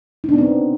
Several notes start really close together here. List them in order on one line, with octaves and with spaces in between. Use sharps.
D#4 D4 B3 C4